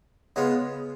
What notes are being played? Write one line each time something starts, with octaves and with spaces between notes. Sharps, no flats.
C#3 G#3 B3 F4